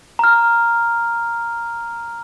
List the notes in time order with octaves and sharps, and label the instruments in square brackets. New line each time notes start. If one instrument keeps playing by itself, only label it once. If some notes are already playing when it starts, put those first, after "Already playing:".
[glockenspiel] A#5 F6